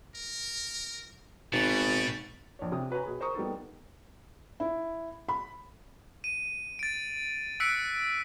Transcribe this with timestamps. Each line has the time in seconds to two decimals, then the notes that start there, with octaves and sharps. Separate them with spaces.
0.15 A#4
1.53 G#1 B2 G4 A6
2.59 A#1 C#5
2.72 C3 G4 D#6
2.91 F#4 B4 C#5 G#5 A#5
3.03 B2 G#4 B5
3.20 A#4 C5 A#5 C#6 D#6
3.35 G3 A#3 B3 D#4 A4
4.60 E4
5.29 B5
6.24 D#7
6.79 A6 D7
7.60 E6 F#6 B6 C#7 D7